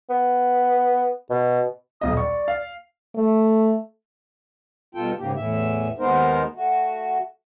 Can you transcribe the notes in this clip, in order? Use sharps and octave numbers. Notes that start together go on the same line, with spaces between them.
B3
B2
D#1 B1 D#5 D#6
D5 C#6
F5
A3
G2 B2 F4 A4 G5
G#2 C#3 A#3 G4
E2 A2 E3 E5
D#2 G#3 B3 D#4 A#4 C5
A3 F#4